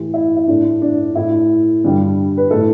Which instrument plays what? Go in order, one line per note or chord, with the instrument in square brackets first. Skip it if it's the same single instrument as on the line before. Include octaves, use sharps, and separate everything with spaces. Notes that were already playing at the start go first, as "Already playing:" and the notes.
Already playing: [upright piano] A2 E3 A3 G4
E4
E4
A2 A3 D4
D4
A2 A3 E4
G2 D3 G3
B4
A2 A3 A4